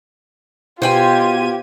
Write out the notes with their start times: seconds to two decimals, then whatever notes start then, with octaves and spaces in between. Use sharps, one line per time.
0.82 B2 F4 G4 C5 G5 G#5 G#6 D#7